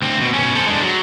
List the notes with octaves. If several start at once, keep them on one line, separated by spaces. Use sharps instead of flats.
D2 C4
B2
B1 C#4
A4 C5
G#3 D4
F#3